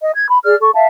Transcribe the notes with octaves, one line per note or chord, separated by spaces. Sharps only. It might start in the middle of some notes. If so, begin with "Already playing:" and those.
D#5
G#6
B5
G#4 D5 F6
A4 C#6
E5 F5 A5